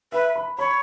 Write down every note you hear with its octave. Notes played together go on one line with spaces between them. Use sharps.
B4 E5
B5
C#5 B5